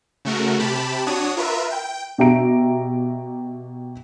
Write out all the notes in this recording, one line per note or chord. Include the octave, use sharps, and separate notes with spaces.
C#3 A3 F#4 A#4
C3 G4 A5 B5
D4 F#4 C#5 D#6
F4 A#4 B4 E5
G5
B2 G4 E5 A#5 D7